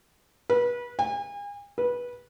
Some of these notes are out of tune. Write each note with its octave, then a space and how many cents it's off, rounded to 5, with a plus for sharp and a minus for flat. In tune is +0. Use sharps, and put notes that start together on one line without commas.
B4 -30
G#5 -40
B4 -20